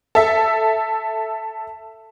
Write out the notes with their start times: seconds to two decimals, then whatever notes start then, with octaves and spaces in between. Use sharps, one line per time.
0.15 A4 E5